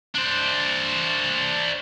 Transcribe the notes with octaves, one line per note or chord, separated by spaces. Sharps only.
D4 C5